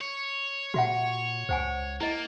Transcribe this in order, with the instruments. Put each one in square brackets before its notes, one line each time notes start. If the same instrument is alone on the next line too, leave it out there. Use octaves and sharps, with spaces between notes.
[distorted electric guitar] C#5
[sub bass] A#2 [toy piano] F#4 E5 F#5
[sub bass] C#2 [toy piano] C5 F#5 G#5
[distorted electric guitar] A#3 [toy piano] E4 D#5